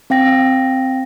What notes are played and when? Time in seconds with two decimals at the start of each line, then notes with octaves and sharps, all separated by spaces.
0.10 C4 F5 G5 A#6